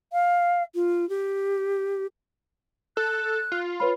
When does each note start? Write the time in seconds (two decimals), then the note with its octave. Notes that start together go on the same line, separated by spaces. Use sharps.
0.13 F5
0.75 F4
1.09 G4
2.97 A4 F#6
3.52 F4
3.80 B4 C#5 B5